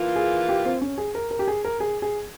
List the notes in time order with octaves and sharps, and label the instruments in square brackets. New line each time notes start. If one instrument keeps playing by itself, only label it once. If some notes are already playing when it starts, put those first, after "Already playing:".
Already playing: [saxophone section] E3 A#3 F4
[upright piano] G#4
G4
C4
C#4
G#4
A#4
A#4
G4
G#4
A#4
G#4
G#4